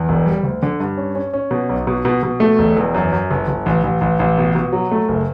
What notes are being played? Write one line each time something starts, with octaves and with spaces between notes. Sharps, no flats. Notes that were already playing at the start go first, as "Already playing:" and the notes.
Already playing: E2
E1
G3
D2
D3
G2
C#4
C#4
C#4
B2
B1
B2
B2
B2
A3
E1
E2
F#2
F#2
G1
G1
A1
A1
A1
A1
B2
B2
F#3
A3
F#1